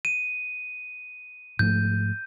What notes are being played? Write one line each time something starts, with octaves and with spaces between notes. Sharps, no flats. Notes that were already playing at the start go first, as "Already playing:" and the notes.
D#7
G#2 F3 A3 G6